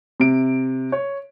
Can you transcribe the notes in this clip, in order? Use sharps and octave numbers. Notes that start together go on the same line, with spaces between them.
C3 D7
C#5